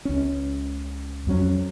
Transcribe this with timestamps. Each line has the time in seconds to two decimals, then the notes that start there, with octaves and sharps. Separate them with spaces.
0.05 C#2 C#4
1.27 F2 F#3 C#4